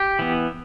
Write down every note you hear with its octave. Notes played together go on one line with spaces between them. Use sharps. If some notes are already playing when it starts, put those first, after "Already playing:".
Already playing: G4
E3 B3